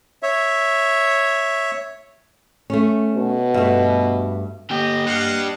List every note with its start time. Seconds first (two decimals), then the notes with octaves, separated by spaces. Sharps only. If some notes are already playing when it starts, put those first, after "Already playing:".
0.23 C#5 E5
2.70 A3 C#4
3.16 B2
3.54 G2 A3
4.71 D3 A#3 G4 D#5
5.07 D4 G4 F5 F#5